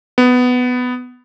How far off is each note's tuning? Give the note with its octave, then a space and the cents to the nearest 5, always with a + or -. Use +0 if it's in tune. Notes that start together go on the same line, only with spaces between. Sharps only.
B3 +10